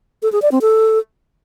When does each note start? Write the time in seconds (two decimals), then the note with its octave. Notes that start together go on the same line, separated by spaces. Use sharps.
0.23 A4
0.32 G#4
0.42 D5
0.52 C4
0.61 A4